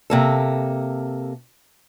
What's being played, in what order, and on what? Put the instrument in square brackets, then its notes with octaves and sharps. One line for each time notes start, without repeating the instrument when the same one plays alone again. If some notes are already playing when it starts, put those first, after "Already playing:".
[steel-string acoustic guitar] C3 A#3 A4